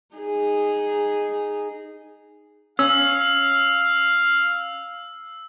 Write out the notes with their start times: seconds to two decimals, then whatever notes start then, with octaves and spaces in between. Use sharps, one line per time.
0.16 D#4 G#4
2.79 C#4 F5 E6